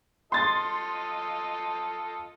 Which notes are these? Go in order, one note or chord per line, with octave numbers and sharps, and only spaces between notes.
F4 A4 D#5 C6 A6